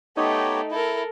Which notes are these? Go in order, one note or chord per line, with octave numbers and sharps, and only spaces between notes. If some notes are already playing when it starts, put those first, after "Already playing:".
A3 B3 D#4 G4 C#5 G5
E4 A4 A#4